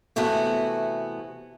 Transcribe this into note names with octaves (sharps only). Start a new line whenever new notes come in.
C3 E3 A3 B3 F#4